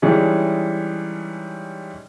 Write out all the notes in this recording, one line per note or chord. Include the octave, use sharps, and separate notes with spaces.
E3 G3 G#3 C#4 D#4